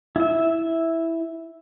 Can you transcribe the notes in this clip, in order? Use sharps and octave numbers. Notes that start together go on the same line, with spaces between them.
E4 E5